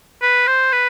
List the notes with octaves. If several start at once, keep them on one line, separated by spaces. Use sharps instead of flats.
B4
C5
B4